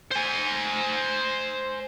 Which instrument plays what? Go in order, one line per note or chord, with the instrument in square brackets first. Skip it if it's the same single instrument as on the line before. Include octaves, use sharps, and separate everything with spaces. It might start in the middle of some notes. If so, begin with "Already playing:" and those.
[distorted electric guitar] C5 G#5